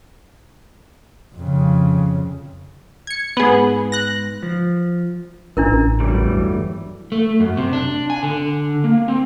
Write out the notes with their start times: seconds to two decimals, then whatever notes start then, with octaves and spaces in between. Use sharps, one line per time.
1.35 F2 C#3
3.07 G#6 C#7
3.37 G#2 B3 G#4 B4
3.92 F#6 A#6
4.43 F3
5.57 A1 D4 E4 A#4
6.00 G1 E2 E3 F#3 G3 A3
7.12 A3
7.40 F#2
7.57 C3
7.73 D4
8.10 G#5
8.23 D3
8.84 A#3
9.08 C4